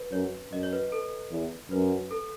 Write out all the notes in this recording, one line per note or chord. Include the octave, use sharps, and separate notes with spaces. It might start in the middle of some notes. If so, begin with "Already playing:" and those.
Already playing: B4
F#2 C#5
F#2 D#5
C#5
B4
A4
E2
F#2 B4
A4